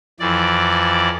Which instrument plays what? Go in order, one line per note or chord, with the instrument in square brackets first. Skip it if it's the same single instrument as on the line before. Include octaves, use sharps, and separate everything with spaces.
[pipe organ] F2 E3 D5